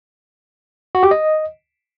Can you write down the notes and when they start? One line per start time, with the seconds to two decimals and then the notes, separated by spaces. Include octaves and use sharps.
0.95 F#4
1.03 G4
1.11 D#5